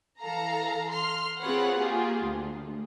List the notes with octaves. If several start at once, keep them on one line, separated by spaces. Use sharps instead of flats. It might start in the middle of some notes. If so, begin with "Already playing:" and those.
E3 A4 F5 A#5
C6 F6
C4 F4 G#4 B4 C#5 F#5
A#3 F4 G4 G#4
D2